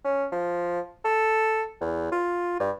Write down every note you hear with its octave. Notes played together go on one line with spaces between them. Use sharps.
C#4
F3
A4
E2
F4
G2